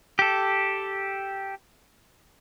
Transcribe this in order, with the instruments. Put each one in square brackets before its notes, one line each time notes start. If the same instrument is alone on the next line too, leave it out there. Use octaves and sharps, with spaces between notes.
[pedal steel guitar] G4 A4